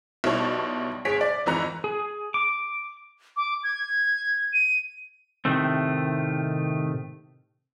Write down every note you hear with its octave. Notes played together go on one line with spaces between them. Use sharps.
B1 B2 G3 E4 C#5 A5
G1 G#4 C#5 B6 D7
D5
G#1 F2 E3 A#5 F#6 C#7
G#4
D6
D6
G#6
D#7
A2 C3 D#3 A3 C4